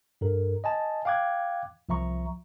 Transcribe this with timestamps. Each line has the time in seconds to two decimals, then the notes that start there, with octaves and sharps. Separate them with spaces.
0.21 G2 A4 A#4
0.64 D#5 G#5 A5
1.05 F5 G5 D6 F#6 G#6
1.89 C2 F3 E5 A#5 C#6